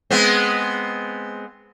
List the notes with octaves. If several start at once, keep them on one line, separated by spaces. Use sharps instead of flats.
G#3 B3 C4